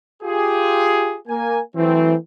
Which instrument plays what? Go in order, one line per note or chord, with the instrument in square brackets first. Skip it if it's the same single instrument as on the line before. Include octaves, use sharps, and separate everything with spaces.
[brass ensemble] F4 G4 G#4
A#3 G#5
[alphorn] E3 [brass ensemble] F#3 A3 C4